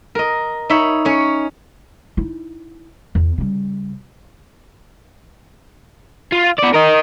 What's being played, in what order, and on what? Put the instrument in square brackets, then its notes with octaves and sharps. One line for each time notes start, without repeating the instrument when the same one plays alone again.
[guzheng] A#4 D#5
D#4 C#5 E5 B5
C#4 C#5
[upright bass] D#4 E4
E2
C#3 G3
[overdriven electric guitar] F4
B3 D5
A#4 D#5